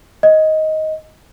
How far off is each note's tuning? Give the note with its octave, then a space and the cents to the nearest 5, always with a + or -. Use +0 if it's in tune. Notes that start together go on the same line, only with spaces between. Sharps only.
D#5 +10